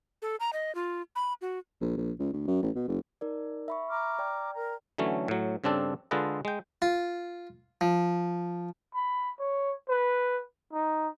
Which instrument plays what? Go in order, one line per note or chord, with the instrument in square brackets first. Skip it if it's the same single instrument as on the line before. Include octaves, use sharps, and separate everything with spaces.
[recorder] A4
A#5
D#5
F4
B5
F#4
[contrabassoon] A#1
A#1
C#2
D2
F#2
A1
B2
F#1
[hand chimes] D#4 A#4 D5
E5 B5 C#6
[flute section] A#5 D6 F6
[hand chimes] D5 G5
[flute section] A#4 A#5
[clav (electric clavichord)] D3 E3 F#3 A3 C#4
A2 F#3
G2 C#3 C4 D4 A4
D3 G#3 F4 A4 B4 D#5
G#3 G5
[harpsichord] F4
F3
[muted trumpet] B5
C#5
B4
D#4